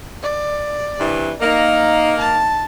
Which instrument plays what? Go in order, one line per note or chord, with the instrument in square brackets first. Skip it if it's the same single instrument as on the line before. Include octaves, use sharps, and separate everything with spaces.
[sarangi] D5
[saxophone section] G2 C3 E3
[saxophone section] A#3 [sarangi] D#4
[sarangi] A5